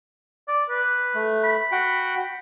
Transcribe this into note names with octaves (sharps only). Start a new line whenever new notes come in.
D5
B4
A3
B5
F#4 F#5 G5